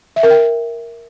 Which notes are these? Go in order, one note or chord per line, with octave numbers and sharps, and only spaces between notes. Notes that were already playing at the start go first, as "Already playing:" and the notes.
E5
A#4
G5